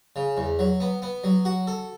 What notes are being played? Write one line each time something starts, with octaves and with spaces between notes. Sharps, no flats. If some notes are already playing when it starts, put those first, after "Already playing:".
C#3
E2
F#3
B3
B3
F#3
F#4
A4